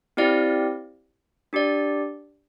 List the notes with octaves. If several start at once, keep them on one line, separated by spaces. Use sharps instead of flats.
C4 E4 G4 D5 F5
D4 G4 D5